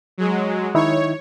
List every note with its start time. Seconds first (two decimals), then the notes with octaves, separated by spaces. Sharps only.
0.18 F#3 G#3
0.75 D#3 D#4 E4 C#5